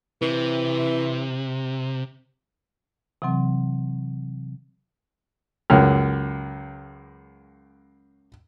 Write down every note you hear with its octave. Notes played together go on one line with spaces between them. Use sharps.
C3 E3
C3 E3 F#3 C4
C#2 F#2 F6